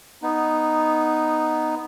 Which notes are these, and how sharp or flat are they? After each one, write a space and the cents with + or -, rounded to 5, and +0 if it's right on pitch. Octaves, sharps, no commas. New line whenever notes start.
B3 +0 D#4 +0